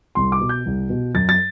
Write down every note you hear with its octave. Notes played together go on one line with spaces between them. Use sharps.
C2 C6
D6
B2
G6
C2
B2
F#2 A6
A6